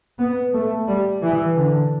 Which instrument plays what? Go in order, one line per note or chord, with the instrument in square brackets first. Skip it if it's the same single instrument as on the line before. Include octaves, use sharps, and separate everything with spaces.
[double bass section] B3
A3
G3
E3
D3